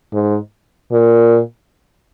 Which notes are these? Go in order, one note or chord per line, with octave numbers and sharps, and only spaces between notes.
G#2
A#2